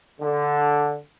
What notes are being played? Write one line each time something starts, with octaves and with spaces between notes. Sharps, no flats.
D3